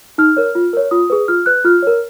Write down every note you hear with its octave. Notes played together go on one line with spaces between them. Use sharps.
D#4 F6
A#4 C#5
F4
A#4 C#5
F4 D#6
G#4 B4
F4 F6
B4 F#6
F4 F6
A#4 C#5